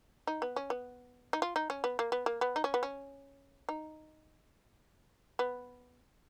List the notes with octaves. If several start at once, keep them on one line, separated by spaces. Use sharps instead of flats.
D#4
B3
C#4
B3
D#4
F4
D#4
C#4
B3
A#3
B3
A#3
B3
D#4
C#4
B3
C#4
D#4
B3